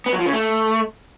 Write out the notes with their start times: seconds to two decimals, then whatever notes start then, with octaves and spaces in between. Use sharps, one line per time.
0.06 B3
0.13 F#3
0.20 F3
0.26 C#3
0.33 A3